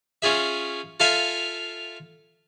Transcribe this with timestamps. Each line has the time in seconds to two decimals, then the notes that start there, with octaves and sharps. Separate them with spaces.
0.22 C#4 F4 G#4 E5
1.00 F4 A4 E5 F5 G#5